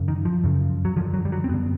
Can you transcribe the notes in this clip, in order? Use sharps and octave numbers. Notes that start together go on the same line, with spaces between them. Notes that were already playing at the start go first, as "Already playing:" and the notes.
Already playing: F#2 C#3
D#3
F3
F#2 C#3
F#3
F#2 D3 F3
F#3
G3
F#3
C4
F#2 D3 B3